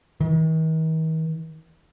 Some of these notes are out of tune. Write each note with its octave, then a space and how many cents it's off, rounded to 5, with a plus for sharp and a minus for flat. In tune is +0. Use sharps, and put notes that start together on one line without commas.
D#3 +45